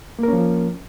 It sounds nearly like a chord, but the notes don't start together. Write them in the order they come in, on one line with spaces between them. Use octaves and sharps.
A#3 A#4 C#4 F3